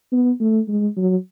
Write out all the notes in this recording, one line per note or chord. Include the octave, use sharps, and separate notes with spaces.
B3
A3
G#3
F#3